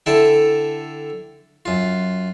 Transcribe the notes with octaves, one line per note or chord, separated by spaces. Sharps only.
D3 E4 A4 G5
F#2 F4